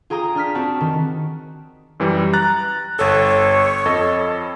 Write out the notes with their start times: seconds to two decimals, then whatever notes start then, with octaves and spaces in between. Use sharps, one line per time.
0.10 F4 G#4 G5 A#5 D#6
0.35 D4 F6 B6
0.55 C4 F#4 A5
0.81 D#3
2.00 F#2 E3 G3
2.33 A#5 F#6 A6
2.99 G1 A4 C#5
3.86 F2 A4 D#5